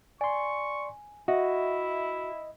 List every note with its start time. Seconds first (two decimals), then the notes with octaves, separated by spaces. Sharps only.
0.21 D5 G#5 C6 C#6
1.28 E4 F#4 D#5 E5